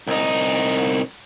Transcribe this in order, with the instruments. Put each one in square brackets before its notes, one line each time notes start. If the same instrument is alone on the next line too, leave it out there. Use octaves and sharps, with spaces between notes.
[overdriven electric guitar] C2 D#4